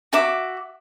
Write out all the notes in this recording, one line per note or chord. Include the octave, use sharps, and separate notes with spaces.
F#4 E5 D6